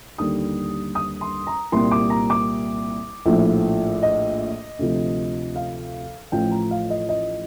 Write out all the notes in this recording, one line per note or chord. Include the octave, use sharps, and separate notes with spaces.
D#2 D3 G3 D#6
D#6
C6
A#5
C2 A#2 G3 C6
D6
A#5
D6
A#1 A2 F3
D#5
D2 C3 F3
F5
A1 A2 F3 G5
A#5
F5
D#5
D#5